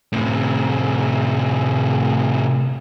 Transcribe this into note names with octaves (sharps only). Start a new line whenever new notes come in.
A2 C3